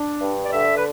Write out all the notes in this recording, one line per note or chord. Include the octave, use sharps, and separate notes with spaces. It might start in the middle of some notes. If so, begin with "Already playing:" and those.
Already playing: D4
G2
D5
D3 E5
B4